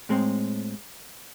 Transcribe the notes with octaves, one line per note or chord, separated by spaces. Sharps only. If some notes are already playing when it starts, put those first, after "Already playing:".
A2 G#3 C4